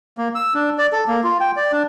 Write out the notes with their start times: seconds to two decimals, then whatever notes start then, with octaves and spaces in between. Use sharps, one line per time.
0.18 A#3
0.35 E6
0.54 D4
0.78 D5
0.92 A4
1.08 A#3
1.24 F4
1.40 G5
1.56 D5
1.72 D4